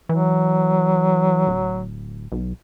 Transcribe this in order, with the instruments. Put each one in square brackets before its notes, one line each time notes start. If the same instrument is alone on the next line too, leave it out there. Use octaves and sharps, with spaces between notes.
[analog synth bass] E3 [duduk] F#3
[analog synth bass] D1
B1